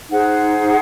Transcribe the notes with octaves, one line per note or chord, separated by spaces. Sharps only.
D#4 G#4 C5 F#5